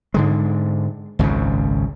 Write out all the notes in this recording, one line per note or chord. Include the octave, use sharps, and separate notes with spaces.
G#2 D3 G#3
G#1 C#2 F#2 C#3